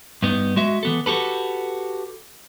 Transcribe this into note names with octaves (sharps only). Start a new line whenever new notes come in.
G2 B3 D#4
G#3 F#4 E5
E3 B3 A4
F#4 G4 A4 B4